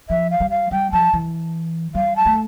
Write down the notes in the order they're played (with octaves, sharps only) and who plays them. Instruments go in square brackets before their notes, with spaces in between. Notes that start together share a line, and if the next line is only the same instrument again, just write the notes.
[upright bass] F3 [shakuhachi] E5
[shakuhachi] F5
[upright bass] G3
[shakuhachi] F5
[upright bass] G3 [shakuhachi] G5
[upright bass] F3 [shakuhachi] A5
[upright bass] E3
[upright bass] G3 [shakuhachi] F5
[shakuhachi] A5
[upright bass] A3